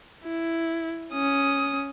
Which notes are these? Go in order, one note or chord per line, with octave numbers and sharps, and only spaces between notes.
E4
C#4 D#6